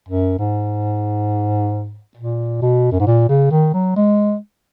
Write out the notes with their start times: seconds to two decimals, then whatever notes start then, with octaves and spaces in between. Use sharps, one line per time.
0.09 F#2
0.39 G#2
2.17 A#2
2.62 B2
2.92 F#2
3.00 G#2
3.07 A#2
3.29 C#3
3.51 D#3
3.74 F#3
3.96 G#3